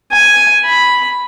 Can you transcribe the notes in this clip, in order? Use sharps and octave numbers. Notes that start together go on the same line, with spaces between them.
G#5
B5